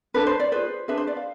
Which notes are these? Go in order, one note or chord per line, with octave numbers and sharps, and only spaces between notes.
D4 A4 B4
C5
D5
F4 G#4 B4 C5
D4 G#4 B4 E5
C5
D5
F5